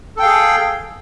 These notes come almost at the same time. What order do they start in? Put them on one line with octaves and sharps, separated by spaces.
A4 G5 F5 G#4